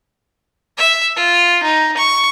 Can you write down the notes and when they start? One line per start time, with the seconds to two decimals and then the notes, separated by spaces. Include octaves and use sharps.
0.78 E5
1.16 F4
1.63 D#4
1.97 C#6